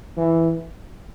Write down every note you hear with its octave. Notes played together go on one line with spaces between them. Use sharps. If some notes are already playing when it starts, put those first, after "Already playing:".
E3